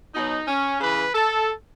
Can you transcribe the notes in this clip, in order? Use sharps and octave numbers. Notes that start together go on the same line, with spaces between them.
B2 F#3 D#4
C#4
C#3 E3 B4
A4